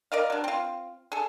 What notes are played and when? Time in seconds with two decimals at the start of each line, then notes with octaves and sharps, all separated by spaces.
0.12 A#4 D5 D#5 F5
0.30 F#3 D4
0.44 C4 F4
1.12 G#4 A4